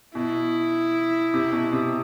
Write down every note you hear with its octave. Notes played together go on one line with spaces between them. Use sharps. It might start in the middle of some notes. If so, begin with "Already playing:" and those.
B2 E4
C3
B2
C3